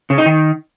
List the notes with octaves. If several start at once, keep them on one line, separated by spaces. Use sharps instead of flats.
C#3
D#4
D#3